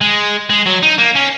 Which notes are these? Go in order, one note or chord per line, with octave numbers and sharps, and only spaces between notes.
G#3
G#3
F#3
D#4
A#3
C#4